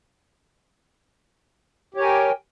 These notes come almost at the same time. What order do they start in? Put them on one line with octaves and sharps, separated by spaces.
G4 C#5 A#4 G#5 G5